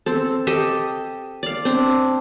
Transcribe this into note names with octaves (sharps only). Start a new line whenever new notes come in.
C4 A4
G4 A4 D#5
D5 F5
C4 D4